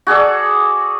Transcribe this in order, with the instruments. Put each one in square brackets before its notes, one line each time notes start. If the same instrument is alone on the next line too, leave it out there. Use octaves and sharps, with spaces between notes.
[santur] F#4 G#4 A4 D5